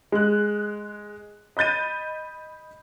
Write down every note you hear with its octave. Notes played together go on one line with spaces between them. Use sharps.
G#3 F#6
D#5 B5 G6 A6 D#7